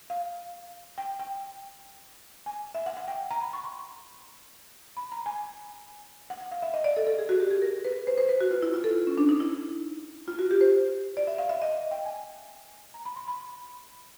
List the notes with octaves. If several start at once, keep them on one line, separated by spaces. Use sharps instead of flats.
F5
G5
G5
G#5
E5
F#5
F#5
G5
A#5
B5
C#6
C6
B5
A#5
G#5
F#5
F#5
F5
E5
D#5
D5
A4
A4
G#4
F#4
G4
G#4
A#4
B4
C5
C5
B4
F#4
F4
E4
F4
A4
C#4
D4
D#4
E4
F4
F#4
G4
C5
D5
E5
F5
E5
D#5
G5
G#5
A#5
B5
C6
B5